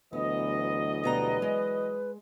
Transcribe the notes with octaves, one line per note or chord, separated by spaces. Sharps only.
D2 E3 F#3 B3 D#5
B2 G3 B4 A#5
G#3